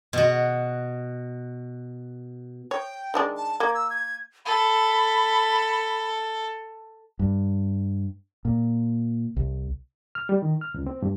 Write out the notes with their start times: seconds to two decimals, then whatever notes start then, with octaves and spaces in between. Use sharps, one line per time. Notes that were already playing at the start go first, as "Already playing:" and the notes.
0.13 B2 F#4
2.71 C#5 G5
3.14 D#3 G#3 D4
3.36 A5
3.60 A#3 G#6
3.74 E6
3.90 G#6
4.45 A4 B5
7.19 G2
8.45 A#2
9.36 C2
10.15 F6
10.29 G3
10.42 D#3
10.61 F6
10.74 C#2
10.86 C4
11.02 G2